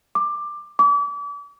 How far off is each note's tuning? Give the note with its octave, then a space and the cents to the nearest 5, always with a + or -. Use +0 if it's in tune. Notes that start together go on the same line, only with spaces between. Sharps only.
D6 +15
D6 -40